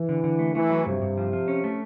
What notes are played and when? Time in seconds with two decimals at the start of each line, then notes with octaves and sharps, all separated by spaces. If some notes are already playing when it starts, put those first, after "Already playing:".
Already playing: E3
0.09 D3
0.24 D3
0.39 A3
0.55 E3 A3
0.70 F#3
0.86 G2 C3
1.02 G2
1.18 F3
1.33 F3
1.48 C#4
1.64 A3